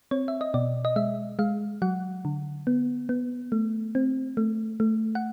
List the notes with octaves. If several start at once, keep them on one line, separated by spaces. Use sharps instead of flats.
C4 C#5
E5
D#5
B2 D5
D#5
G#3 E5
G#3 F5
F#3 F#5
D3
B3
B3
A3
C4
A3
A3
F#5